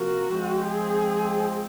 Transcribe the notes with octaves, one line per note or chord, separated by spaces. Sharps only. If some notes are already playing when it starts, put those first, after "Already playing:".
Already playing: C3 F3 A#3 F4 F#4 A#4
F3 G#3 C4
G#4